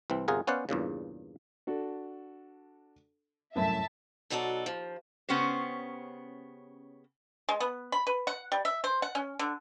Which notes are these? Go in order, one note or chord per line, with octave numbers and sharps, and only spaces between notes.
C2 E3 C4
G1 C3 F4 G#4 A#4 F#5
B3 C#4 C5 D5 F5 F#5
E2 G2 A#2 C#3
D4 F#4 A4
C2 F#2 A2 E5 A5
B2 F#3 D#4 F#4 A4 D5
D#2 F3
C#3 B3 C#4 G4 C5
G#3
B3
B5
B4
F#5
G3
E5
C5
F#5
C#4
D3